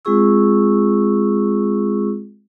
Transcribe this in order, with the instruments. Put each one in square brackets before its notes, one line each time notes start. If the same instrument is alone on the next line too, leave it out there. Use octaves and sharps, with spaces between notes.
[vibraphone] G#3 C4 F4 G#4 C#6 E6